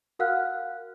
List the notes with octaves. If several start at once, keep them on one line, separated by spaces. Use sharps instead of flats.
F#4 A#4 F5 F#5 F6 F#6